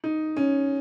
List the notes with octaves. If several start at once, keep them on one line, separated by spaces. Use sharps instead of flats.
D#4
C#4